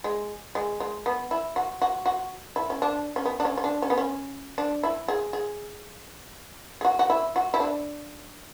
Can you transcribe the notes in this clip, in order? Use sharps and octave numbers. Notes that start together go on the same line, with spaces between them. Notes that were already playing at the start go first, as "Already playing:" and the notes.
G#3
G#3
G#3
B3
E4
F#4
F#4
F#4
E4
C#4
D4
C#4
B3
D4
C#4
C#4
D4
C#4
B3
C#4
D4
E4
G#4
G#4
G#4
F#4
F#4
E4
F#4
E4
D4